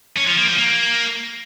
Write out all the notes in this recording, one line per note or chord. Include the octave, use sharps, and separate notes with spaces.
C#4
F3
A#3
F3
A#3